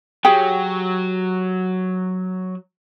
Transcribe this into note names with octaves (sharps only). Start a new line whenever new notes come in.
F#3 G4 G#4 G5